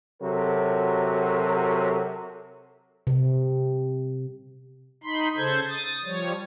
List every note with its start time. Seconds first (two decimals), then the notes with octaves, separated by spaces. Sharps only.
0.21 C3 F#3 F#4 A4 A#4
3.07 C3
5.04 D#4 B5 C6
5.37 C#3 A4 C5 G6 G#6
5.69 D#6 A6
6.05 F3 G3 C#5